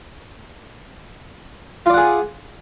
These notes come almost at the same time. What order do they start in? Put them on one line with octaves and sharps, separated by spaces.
F4 D5 F#5 G#4